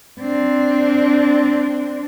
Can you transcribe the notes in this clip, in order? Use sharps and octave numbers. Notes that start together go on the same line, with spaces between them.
C4 D4